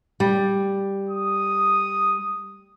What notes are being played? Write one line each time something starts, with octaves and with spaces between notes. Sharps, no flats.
G3
D#6